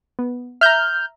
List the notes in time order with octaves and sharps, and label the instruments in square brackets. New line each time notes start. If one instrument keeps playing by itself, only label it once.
[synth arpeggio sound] B3
[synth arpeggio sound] E5 A#5 [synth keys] F6 G6